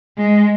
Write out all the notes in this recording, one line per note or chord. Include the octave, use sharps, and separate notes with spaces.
G#3